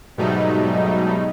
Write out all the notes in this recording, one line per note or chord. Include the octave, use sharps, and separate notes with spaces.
G#2 B2 F#3 G3 A3 D#4